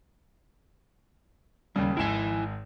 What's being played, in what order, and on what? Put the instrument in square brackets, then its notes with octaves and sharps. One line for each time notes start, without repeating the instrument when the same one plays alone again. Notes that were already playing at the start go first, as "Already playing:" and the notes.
[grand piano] D#2 C#3 [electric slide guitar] G3
[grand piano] G#1 G#3 E7 [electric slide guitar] E4 G#5